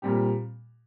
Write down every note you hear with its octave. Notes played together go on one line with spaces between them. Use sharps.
A#2 G3 C4 G4